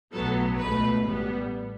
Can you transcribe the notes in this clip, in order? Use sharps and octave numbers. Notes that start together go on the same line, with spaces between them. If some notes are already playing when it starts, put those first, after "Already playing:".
B1 A2 F#3 B3 A4
C#2 B2 A3 B4
A1 A2 G3 B3